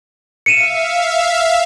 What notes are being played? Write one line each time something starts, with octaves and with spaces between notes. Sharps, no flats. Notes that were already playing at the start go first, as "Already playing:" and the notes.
E5 F5 C#7 D#7 E7